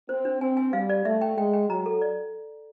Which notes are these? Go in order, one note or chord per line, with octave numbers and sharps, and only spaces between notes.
C4 C5
D4
C4 G#5
G#5
G3 F5
D5
A3 E5
G5
G#3 G5
G5
F#3 A#5
A4
D5